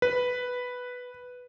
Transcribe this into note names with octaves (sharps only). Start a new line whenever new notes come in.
B4